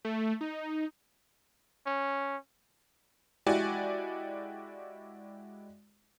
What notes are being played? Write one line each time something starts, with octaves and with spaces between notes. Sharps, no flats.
A3
D#4
C#4
G#3 E4 F#4 G4 D5 G#5